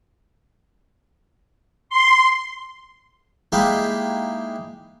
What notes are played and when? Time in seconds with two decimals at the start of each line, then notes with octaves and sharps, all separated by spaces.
1.89 C6
3.52 G#3 A#3 D#4 E4 G4